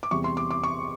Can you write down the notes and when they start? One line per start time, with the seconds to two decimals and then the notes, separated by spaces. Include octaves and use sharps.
0.03 D6
0.11 E2 C3 E3 G3 C#6
0.24 C6
0.37 D6
0.51 D6
0.63 C#6